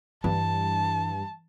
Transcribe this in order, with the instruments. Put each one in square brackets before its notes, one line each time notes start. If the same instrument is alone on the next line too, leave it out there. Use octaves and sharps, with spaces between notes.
[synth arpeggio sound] G2 [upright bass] E3 [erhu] A5